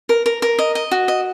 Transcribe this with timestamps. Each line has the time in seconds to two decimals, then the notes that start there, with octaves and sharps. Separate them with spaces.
0.09 A#4
0.26 A#4
0.42 A#4
0.59 D#5
0.75 D#5
0.91 F#4
1.08 D#5